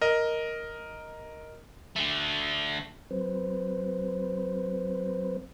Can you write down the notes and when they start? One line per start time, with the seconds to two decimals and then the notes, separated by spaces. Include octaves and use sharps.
0.01 A#4 D#5
1.96 D3 A3
3.11 F#3 C4 B4 C5